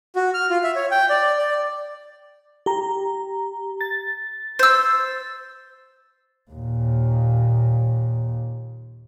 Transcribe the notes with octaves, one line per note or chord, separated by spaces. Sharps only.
F#4
F6
F4
E5
C#5
G5
D5
D5
G4 A#5
A6
C5 E6
D#2 A#2